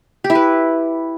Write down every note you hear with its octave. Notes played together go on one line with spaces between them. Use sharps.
G4
E4
B4